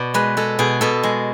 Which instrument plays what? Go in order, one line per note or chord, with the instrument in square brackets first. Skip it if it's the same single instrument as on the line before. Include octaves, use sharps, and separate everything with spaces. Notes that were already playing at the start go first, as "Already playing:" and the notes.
Already playing: [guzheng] B2 D5
G#3 B4
G#3 A4
B2 G#4
B2 A4
G#3